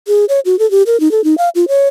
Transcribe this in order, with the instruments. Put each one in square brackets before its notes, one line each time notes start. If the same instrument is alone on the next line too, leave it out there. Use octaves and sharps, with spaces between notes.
[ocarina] G#4
C#5
F#4
A4
G4
A#4
D#4
A4
D#4
F5
F4
C#5